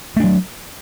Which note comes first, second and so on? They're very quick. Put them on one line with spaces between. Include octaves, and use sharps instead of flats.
A3 D4 F#3